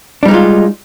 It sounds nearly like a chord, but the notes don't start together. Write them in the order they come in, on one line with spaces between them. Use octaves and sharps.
D4 G3 D#4 G#3 F4